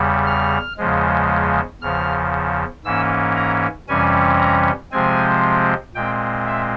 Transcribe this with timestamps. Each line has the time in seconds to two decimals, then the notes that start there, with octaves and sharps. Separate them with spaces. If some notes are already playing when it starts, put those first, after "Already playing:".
Already playing: E2 C#3 G3
0.26 F6
0.78 E2 C#3 F3 G#3
1.81 E2 C#3 F3 F6
2.84 G#2 E3 A#3 C#4 E6
3.36 A#5
3.88 F2 C3 E3 G3 C#4 G#5
4.40 A#5
4.91 C3 F3 G#3 C4 G#5
5.95 A#2 G#3 C4 G5
6.46 E5